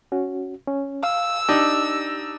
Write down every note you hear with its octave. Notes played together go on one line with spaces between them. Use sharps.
C#4 F#4
C#4
F5 E6
D4 D#4 G4